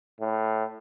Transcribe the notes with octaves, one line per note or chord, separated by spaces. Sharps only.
A2